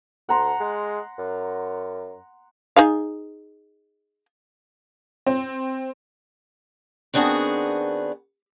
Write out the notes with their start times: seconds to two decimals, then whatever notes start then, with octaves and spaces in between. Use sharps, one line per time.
0.29 D2 F#5 A#5 C6
0.60 G#3
1.18 F#2
2.76 D#4 G#4 F5
5.26 C4
7.14 D#3 B3 C4 D4 F#4 G#4